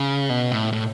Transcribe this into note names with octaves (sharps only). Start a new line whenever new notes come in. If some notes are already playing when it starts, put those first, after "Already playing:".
Already playing: C#3
B2
A2
A2